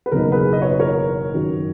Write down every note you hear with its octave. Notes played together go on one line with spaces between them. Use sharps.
B4
F#1 E2 B2 A#3 D#4 A#4
G#4 B4
D#5
C#5
B4
A#4 C#5
F#2 D#3 F#3